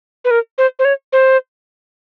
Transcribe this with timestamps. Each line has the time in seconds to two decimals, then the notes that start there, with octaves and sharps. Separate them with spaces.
0.25 B4
0.31 A#4
0.58 C5
0.79 C5
0.85 C#5
1.13 C5